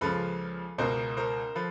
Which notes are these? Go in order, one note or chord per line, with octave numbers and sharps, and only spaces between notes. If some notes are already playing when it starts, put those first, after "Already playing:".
C#2 C#3 F3 A4 B4
C#2 B2 A#4 C5
A#4 C5
F3 A4 B4